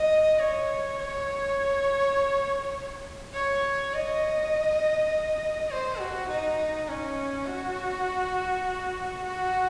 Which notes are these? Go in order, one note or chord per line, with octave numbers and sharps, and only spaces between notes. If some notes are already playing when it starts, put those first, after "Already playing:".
Already playing: D#5
C#5
C#5
C#5
D#5
C5
F#4
D#4
C#4
F#4
F#4